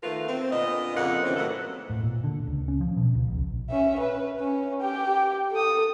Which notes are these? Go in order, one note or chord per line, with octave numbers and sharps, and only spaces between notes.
D#3 A3 F4 A#4 B4
C4
A#2 D3 B3 D#5
F2 C#3 A#3 F4 F#5
D#3 E3 A#3 C4 C#4
A2 F#3 A3 A4 F#5
A2
A#2
D3
C#2
C#4
F3
B2
C#2
A#1
C#4 E5
B4
C#4
G4 G5
A4 D#6